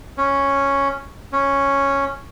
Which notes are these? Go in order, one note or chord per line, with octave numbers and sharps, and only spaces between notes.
C#4
C#4